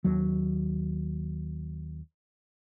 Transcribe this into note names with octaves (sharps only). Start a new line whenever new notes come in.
D#2 F#3